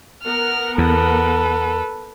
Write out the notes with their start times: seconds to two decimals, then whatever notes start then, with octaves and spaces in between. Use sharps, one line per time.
0.24 B3 A#4 F#5 F6
0.78 E2 A4 B4